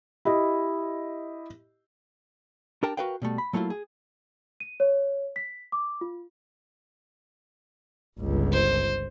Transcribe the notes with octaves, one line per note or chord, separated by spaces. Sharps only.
E4 G4 D#5
D4 G4 A#4 G5 A5
F#4 A#4 B4 F5 G5
B2 G3 A3
B5
F#3 A3 A#3 E4 F4
G#4
D#7
C#5
B6
D6
F4
G1 C#2
C5